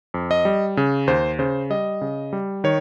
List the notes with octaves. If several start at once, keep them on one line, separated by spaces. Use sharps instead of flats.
F2
D#5
G3
C#3
D#2 C5
C#3 C5
G3 D#5
C#3
G3
D#3 C#5